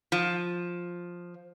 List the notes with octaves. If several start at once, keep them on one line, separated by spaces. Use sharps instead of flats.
F3